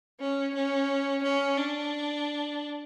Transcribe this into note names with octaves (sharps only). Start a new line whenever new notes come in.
C#4
C#4
C#4
D4